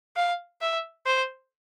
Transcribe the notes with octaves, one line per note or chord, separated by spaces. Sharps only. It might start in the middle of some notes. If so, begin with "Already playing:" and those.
F5
E5
C5